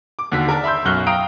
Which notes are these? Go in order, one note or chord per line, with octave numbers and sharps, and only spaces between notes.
D6
D#2 D3 F#4 B6
A#4 D5 A5
E5 B5 C6 E6 G6
B1 F#2 C#6 F6 F#6 G7
F5 G5 A#5 D#6 D7